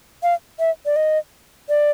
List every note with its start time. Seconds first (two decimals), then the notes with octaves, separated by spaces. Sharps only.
0.23 F5
0.59 E5
0.86 D5
0.96 D#5
1.69 D5